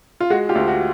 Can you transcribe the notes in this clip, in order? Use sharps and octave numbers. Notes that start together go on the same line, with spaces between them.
F4
G#3 F#4
F4 G4
D2
F#4